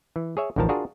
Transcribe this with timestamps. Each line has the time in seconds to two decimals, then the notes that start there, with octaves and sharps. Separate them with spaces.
0.16 E3
0.37 G#4 C#5 E5
0.56 A1 D2 D#3 F3 A#4 A5
0.69 D4 F4 F#4 G#4 A#4